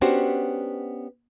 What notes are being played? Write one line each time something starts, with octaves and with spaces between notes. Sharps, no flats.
B3 C#4 D4 F#4 G4 C5